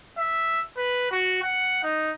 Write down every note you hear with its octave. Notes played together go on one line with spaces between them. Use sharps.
E5
B4
F#4
F#5
D#4